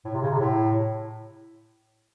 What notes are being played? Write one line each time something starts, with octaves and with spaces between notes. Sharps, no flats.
A2
C3
C#3
C3
A2